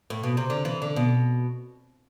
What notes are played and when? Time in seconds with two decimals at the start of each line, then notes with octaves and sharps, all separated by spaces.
0.10 A2
0.23 B2
0.37 C3
0.50 D3
0.65 E3
0.82 D3
0.96 B2